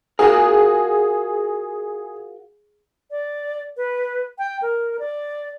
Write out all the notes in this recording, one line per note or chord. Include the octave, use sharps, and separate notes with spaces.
F4 F#4 G#4 A#4
D5
B4
G5
A#4
D5